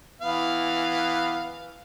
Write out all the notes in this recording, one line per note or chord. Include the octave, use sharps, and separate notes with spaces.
E3 B3 F5